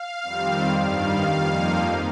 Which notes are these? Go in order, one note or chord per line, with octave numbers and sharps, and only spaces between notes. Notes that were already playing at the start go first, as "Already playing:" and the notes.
Already playing: F5
F2 D#3 G3 C4
G2 D#3 G3 F5
F2 F3 A#3 D#4